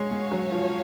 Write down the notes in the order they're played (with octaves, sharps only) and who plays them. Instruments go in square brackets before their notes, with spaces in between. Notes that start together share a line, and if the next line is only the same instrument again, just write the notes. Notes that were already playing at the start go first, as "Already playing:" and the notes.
Already playing: [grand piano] G#3 [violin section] C#4 F#4 C#5 F5
[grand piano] G#3
F#3
F3